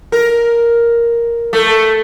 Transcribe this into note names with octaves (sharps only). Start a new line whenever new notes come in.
A#4
A3